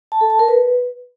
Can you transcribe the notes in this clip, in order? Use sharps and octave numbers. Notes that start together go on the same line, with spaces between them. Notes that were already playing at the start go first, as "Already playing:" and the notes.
A5
A4
A5
A#4
B4